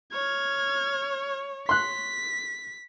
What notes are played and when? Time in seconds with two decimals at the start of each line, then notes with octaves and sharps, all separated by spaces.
0.12 C#5 F6 G#6
1.69 C6 F#6 B6